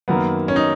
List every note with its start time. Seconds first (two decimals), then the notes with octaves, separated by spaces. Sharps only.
0.08 F#2 D#3 A#3 B3
0.48 C#4
0.56 D#4